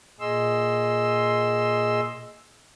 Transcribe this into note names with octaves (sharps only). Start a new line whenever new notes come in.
A#2 G#4 D#5 C6 E6